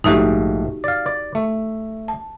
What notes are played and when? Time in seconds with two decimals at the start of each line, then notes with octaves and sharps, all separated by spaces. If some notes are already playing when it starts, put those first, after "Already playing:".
0.04 A#1 G#2 A3 D#4 F#4 G4
0.84 D5 F5
1.06 D5
1.35 A3
2.08 A5